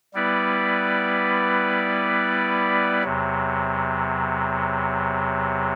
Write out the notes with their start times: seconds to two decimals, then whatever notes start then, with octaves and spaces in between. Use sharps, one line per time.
0.14 G3 B3 E4 B4 D5
3.03 E2 C3 F#3